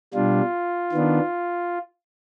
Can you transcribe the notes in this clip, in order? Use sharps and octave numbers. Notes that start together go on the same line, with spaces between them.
B2 G3 D4 F4
D#3 B3 D4